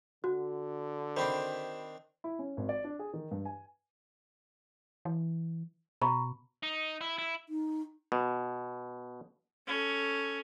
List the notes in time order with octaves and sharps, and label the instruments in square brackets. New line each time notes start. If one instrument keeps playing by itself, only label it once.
[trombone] D3 [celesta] F#4
[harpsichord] D#3 C4 D4 [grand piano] C5 B5
[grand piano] E4
C#4
G#1
D5
D4
G#4
D#3
G2
G#5
[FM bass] E3
[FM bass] B2 [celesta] A#5 B5 C#6
[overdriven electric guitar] D#4
E4
E4
[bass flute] D#4
[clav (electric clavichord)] B2
[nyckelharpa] C#4 A4